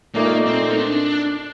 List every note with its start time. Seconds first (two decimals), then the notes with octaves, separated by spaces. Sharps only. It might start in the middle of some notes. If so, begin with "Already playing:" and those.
0.15 A#2 A3 A#3 D#4 A#4 D5
0.46 C4
0.71 D#4
0.78 D4